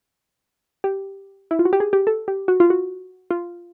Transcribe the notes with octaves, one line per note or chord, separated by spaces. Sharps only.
G4
E4
F4
F#4
G4
G#4
G4
A4
G4
F#4
F4
F#4
F4